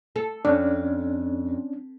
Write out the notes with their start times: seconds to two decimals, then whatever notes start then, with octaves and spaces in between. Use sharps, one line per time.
0.16 A4
0.45 F2 C#4 D4